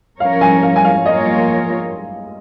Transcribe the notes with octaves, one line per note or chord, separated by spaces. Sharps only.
F3 C#4 A#4 C#5 F5
G#5
F5
G#5
F5
F3 A#3 F4 A#4 C#5 D#5